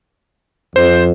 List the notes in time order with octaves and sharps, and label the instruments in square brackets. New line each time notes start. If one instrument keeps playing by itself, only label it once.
[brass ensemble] F2 [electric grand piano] C5